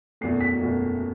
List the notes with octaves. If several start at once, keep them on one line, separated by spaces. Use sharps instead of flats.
F#1 E2 B2 A3 C7
B6
F#1 E2 B2 A3